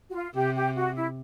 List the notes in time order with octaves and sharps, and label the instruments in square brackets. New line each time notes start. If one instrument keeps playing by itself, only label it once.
[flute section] F#4
F4
[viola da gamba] C3 [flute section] G4
[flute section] G4
F#4
E4